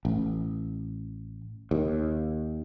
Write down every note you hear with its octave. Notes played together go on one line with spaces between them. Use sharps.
A1
D#2